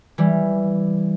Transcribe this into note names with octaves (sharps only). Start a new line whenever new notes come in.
E3 G3